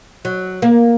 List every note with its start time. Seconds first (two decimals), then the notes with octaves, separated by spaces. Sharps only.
0.25 F#3
0.62 A#3